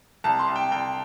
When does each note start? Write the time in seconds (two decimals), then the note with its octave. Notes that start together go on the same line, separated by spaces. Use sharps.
0.24 C2 A5
0.39 C6
0.48 C2
0.56 G5
0.71 C2 G5